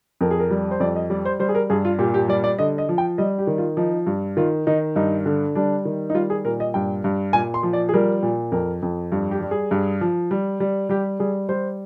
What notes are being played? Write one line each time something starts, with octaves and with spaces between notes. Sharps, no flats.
F2 A#4
G#4
A#4
G3
C5
F2 D5
D#5
G3 D5
C5
G3 C5
G#4
A#4
G2 G#4
F4
A#2 G4
G4
G3 D5
D5
D3 D#5
D#5
F3
G5
G3 D#5
G4
D#3
F4
F3 D#4
G2
D#3 F4
D#3 D#4
G2 D#4
D3
G3 D4
D#3
D#4
G3 F4
G#4
A#2 A#4
D#5
G2 G5
G2
A#2 G#5
C6
F3
D5
G#4
G3 A#4
A#2
F2 A#4
F2
G2
G4
G3
G#4
G2
F3
G3
G3
G3 G4
G3 G#4
G3 C5